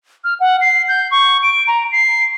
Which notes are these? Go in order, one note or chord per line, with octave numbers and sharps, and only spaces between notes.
F6
F#5
C7
G6
C#6
D7
A#5
C7